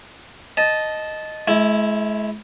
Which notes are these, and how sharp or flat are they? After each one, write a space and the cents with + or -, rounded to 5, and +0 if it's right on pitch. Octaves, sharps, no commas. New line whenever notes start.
D#5 +0 A5 -15
G#3 +40 E4 +0